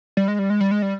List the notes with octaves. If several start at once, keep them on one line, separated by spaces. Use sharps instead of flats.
G3
G#3
G3
G#3
G3
G#3
G3